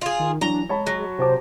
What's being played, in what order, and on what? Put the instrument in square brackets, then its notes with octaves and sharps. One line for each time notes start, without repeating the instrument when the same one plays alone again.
[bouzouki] F4 G#4
[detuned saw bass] D#3
[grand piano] E3 F#3 G7 [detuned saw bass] D4 [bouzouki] A#5
[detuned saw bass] G#3 [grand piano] C#5 A5 B5
[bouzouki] F#3
[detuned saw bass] C3 [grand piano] G4 A5 D6 [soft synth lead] C5